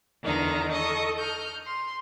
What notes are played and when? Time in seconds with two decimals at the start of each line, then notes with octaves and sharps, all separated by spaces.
0.22 E2 D3 D#3 D#4 A#5
0.70 A4 D#5 C#6 D#6
1.16 F6 G6
1.64 C6